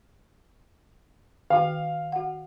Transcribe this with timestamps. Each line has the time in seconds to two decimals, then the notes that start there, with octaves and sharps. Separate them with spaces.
1.50 D#3 F#4 F5 G5
2.12 F#4 F#5